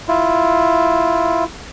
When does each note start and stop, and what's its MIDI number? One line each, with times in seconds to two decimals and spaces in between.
0.08 1.44 64
0.08 1.44 65